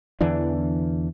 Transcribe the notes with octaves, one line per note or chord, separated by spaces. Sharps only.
E2 D3 E3 D4